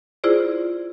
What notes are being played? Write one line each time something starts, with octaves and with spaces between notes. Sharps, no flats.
E4 F4 G#4 C5 D5